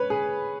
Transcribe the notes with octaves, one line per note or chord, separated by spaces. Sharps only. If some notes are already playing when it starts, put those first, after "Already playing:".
Already playing: B4 C#5
G#4